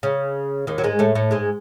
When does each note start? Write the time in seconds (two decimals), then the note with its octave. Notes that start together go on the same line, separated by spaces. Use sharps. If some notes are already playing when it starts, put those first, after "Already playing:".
0.03 C#3
0.67 D#2 D#3
0.78 F#3
0.84 G#2 G#3
0.99 A2 A3
1.15 A2 A3
1.31 G#2 G#3